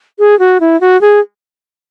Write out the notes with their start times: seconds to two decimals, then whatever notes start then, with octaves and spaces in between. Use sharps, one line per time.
0.19 G#4
0.39 F#4
0.60 E4
0.81 F#4
1.01 G#4